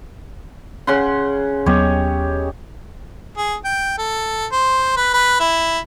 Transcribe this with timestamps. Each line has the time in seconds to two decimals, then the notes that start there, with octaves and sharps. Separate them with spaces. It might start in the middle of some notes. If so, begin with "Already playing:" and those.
0.87 C#3 F#5 C6
1.66 D#2 F#3 B3 G4 C#5 D#5
3.37 G#4
3.65 G5
3.98 A4
4.52 C5
4.97 B4
5.14 B4
5.40 E4